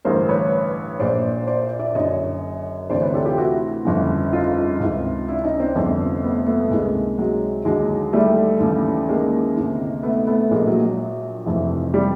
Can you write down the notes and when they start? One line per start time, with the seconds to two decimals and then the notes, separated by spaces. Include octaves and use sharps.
0.05 A1 G2 D3 A#4 C5
0.29 B4 C#5
1.00 A#1 A#2 C5 D5
1.47 C5 D5
1.79 D5 E5
1.95 F#1 F#2 D3 C#5 D#5
2.90 D2 C3 E3 C5 D5
3.02 B4 C#5
3.14 G4 A4
3.26 F4 G4
3.37 E4 F#4
3.85 G1 F2 C#3
4.33 D#4 F4
4.80 C#2 C3 D#3
5.28 D4 E4
5.44 C#4 D#4
5.59 C4 D4
5.75 G1 F2 C3 B3 C#4
6.23 A3 B3
6.47 A3 B3
6.70 C#2 C3 D#3 G#3 A#3
7.18 F#3 G#3
7.65 D#2 D3 F#3 G#3
8.13 G3 A3
8.60 D#2 C#3 E3
9.09 G#3 A#3
9.56 D2 C3 D#3
10.03 A3 B3
10.27 A3 B3
10.51 A#1 A#2 G#3 A#3
10.67 F#3
10.83 F#3
11.46 F1 F2 C3 E3
11.94 G3